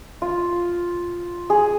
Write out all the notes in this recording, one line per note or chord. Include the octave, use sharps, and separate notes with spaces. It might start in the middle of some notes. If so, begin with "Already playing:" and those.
F4
G#4